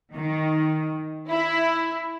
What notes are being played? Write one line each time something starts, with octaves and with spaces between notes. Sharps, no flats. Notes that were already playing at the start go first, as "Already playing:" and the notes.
D#3
E4